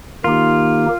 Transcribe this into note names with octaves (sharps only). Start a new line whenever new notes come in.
D#3 A#3 D#4 F4 G4